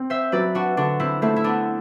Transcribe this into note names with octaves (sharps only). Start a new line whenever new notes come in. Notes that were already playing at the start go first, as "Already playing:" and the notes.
Already playing: C4
C5 E5
F#3 B4 D5
D4 F#4
D3 D4 F#4
C4 E4
A3 C4 E4
E4
B3 D4